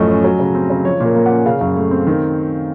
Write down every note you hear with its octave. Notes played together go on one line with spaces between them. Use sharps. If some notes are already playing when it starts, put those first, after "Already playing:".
Already playing: F#2 A2 F3 A3 D#5
C#4
F#3
C#3
C4
C#3
F3 C#5
A#2
A#4
A#3
C#4 F#5
C#3 F5
F#2
A3
C4
D#3